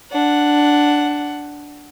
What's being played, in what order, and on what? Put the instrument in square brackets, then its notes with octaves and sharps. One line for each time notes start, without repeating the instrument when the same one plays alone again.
[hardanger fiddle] D4 F#5